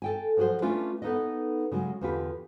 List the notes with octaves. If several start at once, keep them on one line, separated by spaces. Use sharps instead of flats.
A4 G5 G#5
F3 F#3 F#4 G#4 C5
A3 C#4 D4 F4 B4 G#5
B3 D#4 A4 B4 D#5
C#3 F#3 G#3
E2 D3 F4 G4 B4